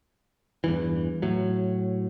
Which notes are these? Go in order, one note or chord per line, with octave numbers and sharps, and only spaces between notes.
E2 G2 E3
A2 F#3